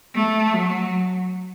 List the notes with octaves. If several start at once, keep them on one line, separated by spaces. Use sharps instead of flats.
A3
F#3